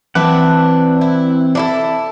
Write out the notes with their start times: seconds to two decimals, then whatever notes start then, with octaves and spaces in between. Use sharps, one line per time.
0.15 E3 C4 D4 B4 E5 F#5
1.01 E4
1.55 D4 E4 A4